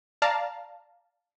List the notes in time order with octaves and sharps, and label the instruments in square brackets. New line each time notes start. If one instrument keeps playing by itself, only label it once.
[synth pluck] D5 F5 A5 A#5